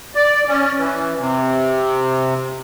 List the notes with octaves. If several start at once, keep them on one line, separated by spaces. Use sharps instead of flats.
D5
C#4
E3
C3